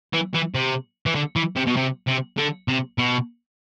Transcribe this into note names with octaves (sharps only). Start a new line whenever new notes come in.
E3
E3
C3
E3
D3
E3
C3
B2
C3
C3
D3
C3
B2